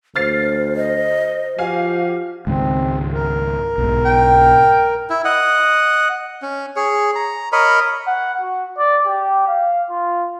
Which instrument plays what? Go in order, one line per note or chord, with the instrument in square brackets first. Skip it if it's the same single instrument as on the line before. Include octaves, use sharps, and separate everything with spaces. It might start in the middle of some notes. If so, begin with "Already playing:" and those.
[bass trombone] D2 [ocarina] C5 [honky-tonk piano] F6 A6 C7
[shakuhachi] D#5
[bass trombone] F3 [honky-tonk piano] F#4 F5 G#5 [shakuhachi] G4
[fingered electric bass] C#2 G#2 D#3 [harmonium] C4
[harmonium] A#4
[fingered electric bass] B1 G#2
[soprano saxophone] G5
[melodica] E4
D#5 F#5
C#4
G#4 C#5
A#5
A#4 C#5 D#5 B5
[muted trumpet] F#5
F#4
D5
G4
F5
F4